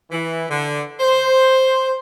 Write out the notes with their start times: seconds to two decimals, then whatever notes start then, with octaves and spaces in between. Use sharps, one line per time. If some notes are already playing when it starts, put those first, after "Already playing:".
0.10 E3
0.49 D3
1.00 C5